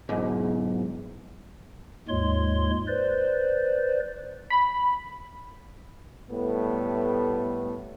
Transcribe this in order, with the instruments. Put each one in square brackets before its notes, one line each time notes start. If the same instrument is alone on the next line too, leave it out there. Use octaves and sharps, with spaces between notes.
[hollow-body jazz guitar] B1 G#2
[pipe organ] D#2 G#2 G#3 F4 C#5 C6
B4 C5 D5
[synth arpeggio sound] B5
[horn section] A2 G3 A3 B3